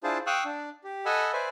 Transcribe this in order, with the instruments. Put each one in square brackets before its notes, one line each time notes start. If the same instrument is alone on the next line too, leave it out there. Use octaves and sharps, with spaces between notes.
[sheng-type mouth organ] D4 E4 F4 G#4 C5 A5
F5 G5 C#6 D#6 E6 F#6
D4
G4
A4 D#5 F#5 G#5 B5 E6
B4 C5 D5 E5 G#5